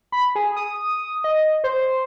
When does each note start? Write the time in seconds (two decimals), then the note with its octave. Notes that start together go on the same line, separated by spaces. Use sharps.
0.12 B5
0.35 G#4
0.56 D#6
1.24 D#5
1.64 C5